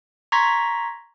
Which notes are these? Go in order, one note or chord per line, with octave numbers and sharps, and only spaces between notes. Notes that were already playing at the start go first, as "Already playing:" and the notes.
A#5 C6 C#6 G#6 A#6 B6